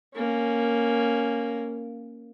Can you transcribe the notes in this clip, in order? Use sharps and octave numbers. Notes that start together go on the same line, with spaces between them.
A#3 C#4